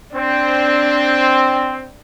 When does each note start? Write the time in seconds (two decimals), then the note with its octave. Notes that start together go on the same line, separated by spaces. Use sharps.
0.16 C4 D4